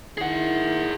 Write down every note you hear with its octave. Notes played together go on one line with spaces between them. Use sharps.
D#3 E4 G#4 F#5